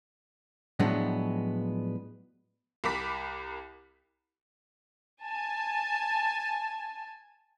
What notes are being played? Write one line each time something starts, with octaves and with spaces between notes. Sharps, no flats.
A2 F3 F#3 G#3 B3 D4
C2 A#4 B5 D6 B6
G#5 A5